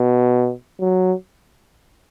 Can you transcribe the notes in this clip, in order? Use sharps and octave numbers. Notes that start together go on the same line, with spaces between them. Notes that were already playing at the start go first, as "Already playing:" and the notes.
Already playing: B2
F#3